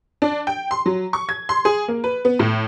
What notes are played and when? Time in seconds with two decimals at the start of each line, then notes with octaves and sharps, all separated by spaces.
0.22 D4
0.47 G5
0.71 C6
0.86 F#3
1.13 C#6
1.29 G#6
1.49 C6
1.65 G#4
1.88 A#3
2.04 B4
2.25 B3
2.39 A2